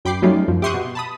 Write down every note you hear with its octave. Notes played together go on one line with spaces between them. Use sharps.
F#2 G5 B5 D6 C7
F#3 G3 A3 C#4 D#4 F4
F#2 F3
G4 E5 C6 C#6 D#6 F#6
B2
A5 B5 D#6